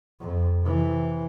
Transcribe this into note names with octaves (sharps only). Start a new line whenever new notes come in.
F2
C3 E3